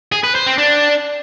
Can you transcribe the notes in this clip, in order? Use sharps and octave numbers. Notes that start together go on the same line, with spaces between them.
G#4
B4
C5
C4
D4